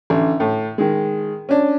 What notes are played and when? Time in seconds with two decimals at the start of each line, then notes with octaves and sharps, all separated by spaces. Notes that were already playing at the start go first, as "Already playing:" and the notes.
0.10 A1 D3
0.40 A2
0.78 D#3 G#3
1.49 C#4 D4